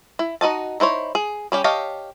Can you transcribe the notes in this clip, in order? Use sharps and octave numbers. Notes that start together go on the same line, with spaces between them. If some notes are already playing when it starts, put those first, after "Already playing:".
E4
D#4 F#4 D#5 A5
D#4 E4 C5 C#5
G#4
G3 C#4 G4
G4 C#5 D#5 F5 A5